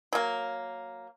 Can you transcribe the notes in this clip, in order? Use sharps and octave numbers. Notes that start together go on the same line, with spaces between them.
F#3 A#3